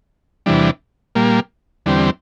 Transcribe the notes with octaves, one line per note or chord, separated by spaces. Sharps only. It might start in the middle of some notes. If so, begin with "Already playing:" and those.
E2 C3 E3 G3 D4
A#2 G3 A#3
E2 D3 G3 C4